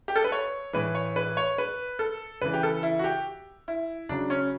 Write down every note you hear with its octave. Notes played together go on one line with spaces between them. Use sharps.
G4
A4
B4
C#5
A2 E3 B4
C#5
B4
C#5
B4
A4
C#3 E3 B4
G4
A4
E4
F#4
G4
E4
C#3 F#3 D4
C#4